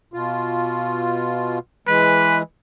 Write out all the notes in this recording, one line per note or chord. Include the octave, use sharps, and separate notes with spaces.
B2 F4
E3 G#3 B4